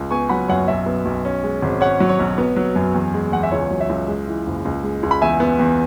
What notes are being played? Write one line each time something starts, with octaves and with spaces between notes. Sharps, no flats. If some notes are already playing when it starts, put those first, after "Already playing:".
Already playing: C#2
B3 G#5 C#6
F#3 F#5 B5
F#2 C#5 F#5
B1 E5
B3
B1
C#4
G#3
G#1
C#4 C#5 F#5
F#3
C#5
B1
B3
F#3
F#2
E2
G#3
E2 F#5
E5
C#2 C#5
F#3
E5
C#2
G#3
E3
F#1
C#2
G#3
C#2
B5
E2 E5 G#5
B3
E2